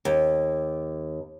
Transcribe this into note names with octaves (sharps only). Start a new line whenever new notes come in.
D#2